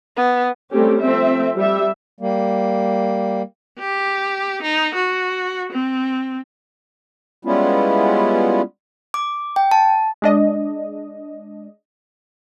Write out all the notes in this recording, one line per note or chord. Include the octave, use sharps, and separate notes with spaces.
B3
G3 A3 C4 C#4 G4
F3 A3 C4 E5
G3 E5
G3 A#3
G4
D#4
F#4
C4
G3 G#3 B3 C#4 E4 F4
D6
G5
A5
G#3 D4 D#5